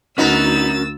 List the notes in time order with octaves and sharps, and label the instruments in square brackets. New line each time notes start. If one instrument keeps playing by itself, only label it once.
[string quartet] D2 E6 A6 [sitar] B3 D#4 [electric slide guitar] C#4 F#4 A#4